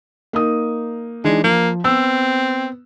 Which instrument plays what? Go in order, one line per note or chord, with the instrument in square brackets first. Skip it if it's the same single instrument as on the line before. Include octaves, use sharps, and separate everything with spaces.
[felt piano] A#3 D#4 D#6
[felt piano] E3 D4 D#4 [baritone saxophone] G#3
[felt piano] F3 [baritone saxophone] A#3
[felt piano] B3 E6 [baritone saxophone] C4